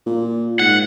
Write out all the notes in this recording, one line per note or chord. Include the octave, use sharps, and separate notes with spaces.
A#2
G#2 F#5